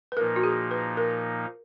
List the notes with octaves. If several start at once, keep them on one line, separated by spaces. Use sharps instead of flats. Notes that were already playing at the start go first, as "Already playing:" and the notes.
B4
A#2 F3 A#3 D#4 A#4
F#4
G#4
B4
A#4